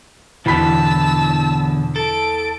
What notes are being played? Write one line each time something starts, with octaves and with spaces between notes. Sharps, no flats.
E2 B2 D3 E3 A5 B5 E6 B6
A4 D7